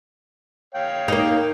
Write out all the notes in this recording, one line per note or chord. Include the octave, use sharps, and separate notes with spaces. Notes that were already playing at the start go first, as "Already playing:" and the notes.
C#5 F5 G5
A#3 D#4